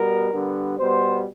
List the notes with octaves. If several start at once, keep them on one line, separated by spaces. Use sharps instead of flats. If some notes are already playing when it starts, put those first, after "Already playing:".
Already playing: B2 G3 B3 A#4
D3 G3 B3
B2 G3 B3 C5